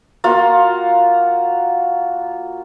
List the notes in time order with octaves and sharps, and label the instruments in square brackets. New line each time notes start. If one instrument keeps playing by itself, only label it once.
[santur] A#3 F4 F#4